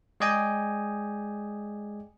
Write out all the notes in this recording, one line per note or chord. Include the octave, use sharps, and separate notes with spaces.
G#3 G#4 D5 D#5 G5 G#5